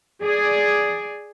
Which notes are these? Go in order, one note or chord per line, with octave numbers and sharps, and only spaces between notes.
G#4 D5